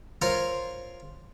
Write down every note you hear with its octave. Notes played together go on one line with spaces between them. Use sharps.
F4 A#4 C5 C#5